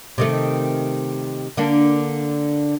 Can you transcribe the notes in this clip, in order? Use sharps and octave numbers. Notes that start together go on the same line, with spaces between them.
C3 D#3 A3
D3 A#3 D4